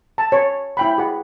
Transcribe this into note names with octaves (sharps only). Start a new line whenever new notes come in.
A5
C#5
E4 G5 B5
G#4 F#5